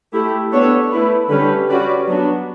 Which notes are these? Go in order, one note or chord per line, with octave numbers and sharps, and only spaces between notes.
A3 E4 G4
B3 D4 A4 C#5
A3 E4 B4
D3 G3 C#4 G4 B4
G3 C#4 F#4 B4 D5
F#3 B3 D4 F#4